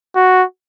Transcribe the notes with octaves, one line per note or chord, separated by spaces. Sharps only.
F#4